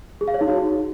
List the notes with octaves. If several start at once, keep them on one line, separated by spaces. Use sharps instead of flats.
G#4
F5
C#5
D#4
F#4